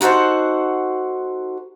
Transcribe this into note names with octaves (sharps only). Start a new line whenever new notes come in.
D#4 F#4 A4 C5 F#5